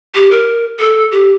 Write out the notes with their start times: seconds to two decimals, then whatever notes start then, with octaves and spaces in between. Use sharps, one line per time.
0.15 G4
0.31 A#4
0.79 A4
1.12 G4